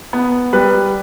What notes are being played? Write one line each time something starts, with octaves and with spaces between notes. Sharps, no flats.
B3
G3 B4